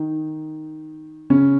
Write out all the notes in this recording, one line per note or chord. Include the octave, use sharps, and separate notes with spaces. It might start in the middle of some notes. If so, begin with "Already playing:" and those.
Already playing: D#3 D#4
C#3 C#4